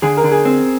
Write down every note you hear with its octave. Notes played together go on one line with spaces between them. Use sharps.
D3 G#4
A#4
D3
G#4
C4